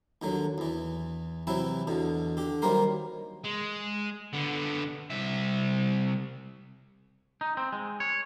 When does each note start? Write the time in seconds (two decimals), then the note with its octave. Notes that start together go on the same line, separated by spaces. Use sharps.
0.22 D#2 D3 F#3
0.58 E2 E3
1.47 C3 E3 F#3 E4
1.87 E2 B2 D3
2.37 D3 G4
2.62 D#3 F#3 G3 A#3 A#4 C5
3.45 G#3
4.33 D3 B3
5.10 C2 E5
7.41 D#4
7.57 C4
7.72 G#3
8.00 C#5